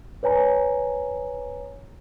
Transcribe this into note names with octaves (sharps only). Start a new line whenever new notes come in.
B4 C#5 G#5 A#5